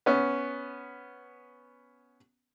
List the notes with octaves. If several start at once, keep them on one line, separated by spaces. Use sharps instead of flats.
B3 C#4